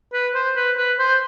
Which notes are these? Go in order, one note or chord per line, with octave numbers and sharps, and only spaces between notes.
B4
C5
B4
B4
C5